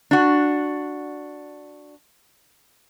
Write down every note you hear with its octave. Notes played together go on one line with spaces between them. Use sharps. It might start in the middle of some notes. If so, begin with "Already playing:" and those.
D4 F#4